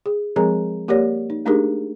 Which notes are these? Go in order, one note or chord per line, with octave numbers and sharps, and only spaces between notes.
G#4
F3 G#3 C4 G#4 A#4 A#5
A#3 G4 A#4 C#5 D5
D#4
A3 D4 D#4 G4 G#4 A#4